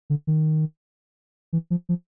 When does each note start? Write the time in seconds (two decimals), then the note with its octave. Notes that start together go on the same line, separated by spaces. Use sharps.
0.10 D3
0.27 D#3
1.53 E3
1.70 F3
1.89 F3